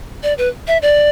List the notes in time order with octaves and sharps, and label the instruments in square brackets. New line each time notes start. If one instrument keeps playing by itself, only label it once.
[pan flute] D5
B4
E5
D5